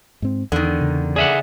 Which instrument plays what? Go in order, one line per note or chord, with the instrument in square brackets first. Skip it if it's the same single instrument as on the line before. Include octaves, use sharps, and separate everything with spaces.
[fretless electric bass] G#2 C4
[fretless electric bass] E2 [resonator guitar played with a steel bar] D3 D#3
[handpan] C#3
[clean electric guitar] G#4 E5 F#5 [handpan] D5